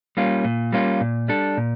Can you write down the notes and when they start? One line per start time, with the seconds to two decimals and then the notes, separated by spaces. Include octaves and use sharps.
0.17 G3 A#3 C#4 F4
0.44 A#2
0.72 G3 A#3 C#4 F4
1.01 A#2
1.28 G3 D4 A4
1.57 A#2